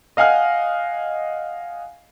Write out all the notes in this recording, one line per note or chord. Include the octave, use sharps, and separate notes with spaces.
D#5 F5 F#5 G#5 F6